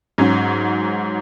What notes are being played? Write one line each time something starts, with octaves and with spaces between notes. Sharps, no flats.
G#2 F#3 C#4